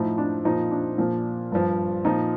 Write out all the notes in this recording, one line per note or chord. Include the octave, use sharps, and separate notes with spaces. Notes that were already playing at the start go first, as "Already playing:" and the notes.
Already playing: A2 F3 D#4
D4
A#2 F3 D#4
D4
A#2 F3
G2 F3
A#2 F3 D#4